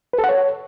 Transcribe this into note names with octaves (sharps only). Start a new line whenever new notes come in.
B4
A4
F#5
C#5